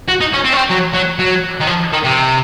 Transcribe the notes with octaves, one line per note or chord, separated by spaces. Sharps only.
F#4
D#4
C#4
C4
C#4
C4
F#3
F#3
F#3
D#3
F3
D#3
C3